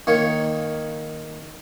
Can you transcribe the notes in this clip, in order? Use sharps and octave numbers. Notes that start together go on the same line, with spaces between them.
D#3 A#3 C#5